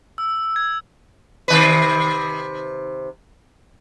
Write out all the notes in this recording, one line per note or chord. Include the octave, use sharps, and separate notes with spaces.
E6
G#6
C3 D#3 B4